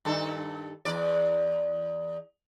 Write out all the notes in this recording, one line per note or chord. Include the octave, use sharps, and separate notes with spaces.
G2 D#3 A4
E2 D5